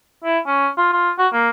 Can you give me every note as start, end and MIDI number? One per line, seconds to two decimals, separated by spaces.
0.24 0.39 64
0.46 0.68 61
0.77 0.90 65
0.92 1.11 65
1.19 1.27 66
1.33 1.50 58